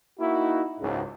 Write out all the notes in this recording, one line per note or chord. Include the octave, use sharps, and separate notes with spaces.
A#3 D#4 E4 F#4
F#1 C#2 G#2